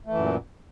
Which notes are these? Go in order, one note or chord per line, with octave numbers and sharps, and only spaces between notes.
F#2 A#2 E3 A3